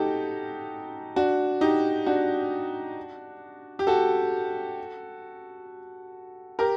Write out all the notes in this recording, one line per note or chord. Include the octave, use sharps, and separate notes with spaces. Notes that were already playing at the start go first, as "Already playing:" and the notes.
Already playing: D#4 F#4 G4 A4
D4 F#4
D#4 G4
D4 F#4
G4
F#4 A4
G4 A#4